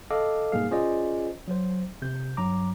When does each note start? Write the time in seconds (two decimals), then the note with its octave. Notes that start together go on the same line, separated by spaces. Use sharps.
0.11 A4 D#5 F5 D6
0.52 G#2 B2 G3 A#3 G#4 F5
0.71 C#4 F4 G#4 C5 D5 D#5
1.48 F#3 C5
2.02 C3 G6
2.37 G2 F#3 A#5 D6